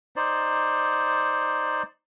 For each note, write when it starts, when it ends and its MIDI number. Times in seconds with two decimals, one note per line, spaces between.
0.16 1.83 63
0.16 1.83 72
0.16 1.83 74